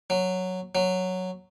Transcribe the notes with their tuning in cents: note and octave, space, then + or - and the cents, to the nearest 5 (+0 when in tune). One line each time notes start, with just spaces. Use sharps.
F#3 -5
F#3 -5